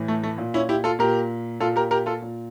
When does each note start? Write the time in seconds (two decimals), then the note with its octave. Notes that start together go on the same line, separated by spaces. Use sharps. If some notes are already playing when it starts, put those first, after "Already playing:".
Already playing: A2 E3
0.08 A3
0.23 A3
0.38 A#2
0.54 C#4 E4
0.69 E4 G4
0.84 F4 A4
0.99 A#2 G4 A#4
1.60 A#2 F4 A4
1.76 G4 A#4
1.91 G4 A#4
2.06 F4 A4
2.22 A#2